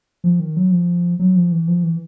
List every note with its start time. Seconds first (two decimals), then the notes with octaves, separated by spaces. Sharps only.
0.24 F3
0.40 D#3
0.57 F#3
0.71 F3
1.19 F#3
1.36 F3
1.52 E3
1.68 F3
1.83 E3